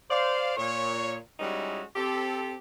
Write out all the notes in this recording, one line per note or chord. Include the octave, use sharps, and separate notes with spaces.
C5 D5 F5
A#2 C#5
G3 G#3 C#4 D#4 E4 F#4
C4 G4 A4